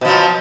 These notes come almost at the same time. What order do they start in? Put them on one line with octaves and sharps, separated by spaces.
B2 F3 F#3